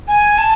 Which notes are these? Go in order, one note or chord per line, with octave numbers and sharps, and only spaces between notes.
G#5
A5